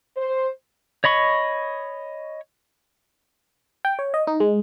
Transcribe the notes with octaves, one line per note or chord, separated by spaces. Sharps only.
C5
C#5 D#5 B5 C#6
G5
C#5
D#5
D#4
G#3